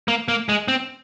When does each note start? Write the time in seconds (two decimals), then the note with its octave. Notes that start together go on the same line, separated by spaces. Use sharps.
0.08 A#3
0.28 A#3
0.49 G#3
0.68 C4